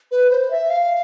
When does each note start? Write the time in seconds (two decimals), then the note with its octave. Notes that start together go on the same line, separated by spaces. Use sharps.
0.11 B4
0.30 C5
0.51 E5
0.70 F5